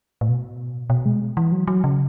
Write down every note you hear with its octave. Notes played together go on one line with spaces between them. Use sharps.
A2
B2
B2
G#3
E3
F#3
F#3
C#3